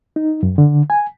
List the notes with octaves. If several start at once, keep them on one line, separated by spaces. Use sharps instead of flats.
D#4
F#2
D3
G#5